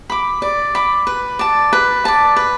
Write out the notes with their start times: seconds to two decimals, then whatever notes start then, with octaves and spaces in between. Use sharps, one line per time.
0.10 B5 D6
0.42 D5
0.75 B5 D6
1.07 B4
1.39 D5 A5
1.73 B4
2.05 D5 A5
2.36 B4